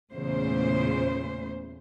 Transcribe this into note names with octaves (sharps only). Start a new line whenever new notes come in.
E2 A#2 C#3 A3 C5